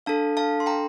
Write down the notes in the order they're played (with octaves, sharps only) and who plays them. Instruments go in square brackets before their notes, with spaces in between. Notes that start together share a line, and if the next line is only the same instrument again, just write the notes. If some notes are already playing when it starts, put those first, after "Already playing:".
[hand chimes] D4 A4 F5 A5
F5 A5
C6
G5 A#5